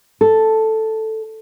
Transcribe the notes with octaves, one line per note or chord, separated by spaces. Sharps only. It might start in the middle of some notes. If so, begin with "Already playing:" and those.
A4